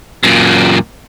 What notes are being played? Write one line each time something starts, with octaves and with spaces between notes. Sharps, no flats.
F#2 A#2